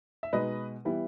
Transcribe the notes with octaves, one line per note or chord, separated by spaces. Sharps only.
E5
B2 G#3 D#4 B4 D#5
E3 G3 B3 E4